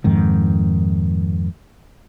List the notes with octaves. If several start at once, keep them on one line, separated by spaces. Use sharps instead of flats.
F2 G#2 D#3